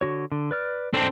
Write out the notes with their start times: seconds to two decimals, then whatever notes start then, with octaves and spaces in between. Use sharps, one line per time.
0.01 D3 F#4 C#5
0.32 D3
0.51 B4 D5 F6
0.94 C4 D4 A4 A5